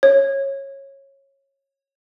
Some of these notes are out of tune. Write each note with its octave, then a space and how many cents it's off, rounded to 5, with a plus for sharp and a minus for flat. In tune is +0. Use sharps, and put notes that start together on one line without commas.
C#5 -20